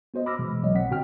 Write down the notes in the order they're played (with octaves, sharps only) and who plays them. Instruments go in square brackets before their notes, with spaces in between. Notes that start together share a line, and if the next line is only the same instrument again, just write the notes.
[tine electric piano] B3 F#4 C5 D#5
B5 D6 E6 F6 A#6
B2 E3 G#3
B1 B2 F#3 C#5 D#5
C4 F#5 B6
A2 D3 C4 F#4 G5 F6